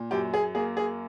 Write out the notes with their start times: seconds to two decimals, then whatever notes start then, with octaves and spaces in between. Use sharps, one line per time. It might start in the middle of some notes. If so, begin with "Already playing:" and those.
Already playing: A#2
0.11 F#2 G4
0.34 G#4
0.55 A#3 G#4
0.77 G#4